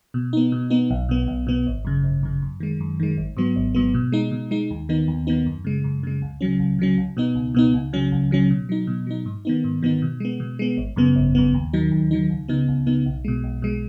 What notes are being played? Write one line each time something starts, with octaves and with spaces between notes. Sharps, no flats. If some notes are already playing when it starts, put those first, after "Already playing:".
B2
B3 D#4
B2
B3 D#4
B1
B2 B3
B1
B2 B3
G#1
F#2 C#3
G#1
F#2 C#3
F#2
D#3 G#3
F#2
D#3 G#3
G#1
G#2 F#3 B3
G#1
G#2 F#3 B3
B2
G#3 D#4
B2
G#3 D#4
D#2
D#3 B3 D#4
D#2
D#3 B3 D#4
F#2
C#3 G#3
F#2
C#3 G#3
C#2
C#3 F#3 C#4
C#2
C#3 F#3 C#4
C#2
B2 B3 D#4
C#2
B2 B3 D#4
C#2
C#3 F#3 C#4
C#2
C#3 F#3 C#4
B2
F#3 D#4
B2
F#3 D#4
G#2
D#3 B3 D#4
G#2
D#3 B3 D#4
B2
G#3 B3
B2
G#3 B3
G#1
F#2 C#3 B3
G#1
F#2 C#3 B3
D#2
D#3 F#3 D#4
D#2
D#3 F#3 D#4
C#2
C#3 B3 D#4
C#2
C#3 B3 D#4
B1
B2 G#3
B1
B2 G#3